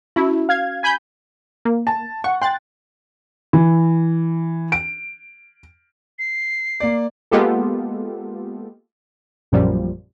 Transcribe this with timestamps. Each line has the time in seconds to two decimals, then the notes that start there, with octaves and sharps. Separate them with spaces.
0.16 C#4 E4 F#4
0.49 F5 G#6
0.83 G#5 B5 G6
1.65 A#3
1.87 A5
2.24 F#5 C#6
2.42 G5 C6 F#6 A6
3.53 E3
4.72 D7
6.19 C7
6.80 A#3 D5
7.31 G#3 A#3 B3 F4 G4 A4
9.52 A#1 F#2 A#2 F3 G3